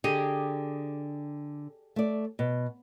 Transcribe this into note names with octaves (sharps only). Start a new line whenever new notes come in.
D3 G4 G#4 D#5
A3 D5
B2